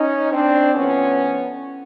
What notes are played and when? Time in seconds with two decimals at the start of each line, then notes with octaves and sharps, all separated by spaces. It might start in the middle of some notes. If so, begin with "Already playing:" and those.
Already playing: C#4 D#4
0.31 C4 D4
0.74 A2 F3 B3 C#4